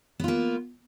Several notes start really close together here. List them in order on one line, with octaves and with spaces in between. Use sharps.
B3 F4 A#3